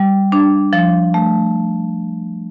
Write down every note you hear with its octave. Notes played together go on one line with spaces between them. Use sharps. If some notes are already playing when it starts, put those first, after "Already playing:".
Already playing: G3
D4
F3
A3